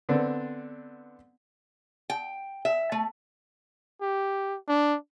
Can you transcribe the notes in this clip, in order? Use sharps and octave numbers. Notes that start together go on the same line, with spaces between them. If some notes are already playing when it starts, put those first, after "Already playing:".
D3 B3 C4 D4
G5
E5
A3
G4
D4